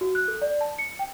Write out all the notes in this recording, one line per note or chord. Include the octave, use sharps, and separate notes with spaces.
F#4
F#6
A4
D5
A5
C#7
G5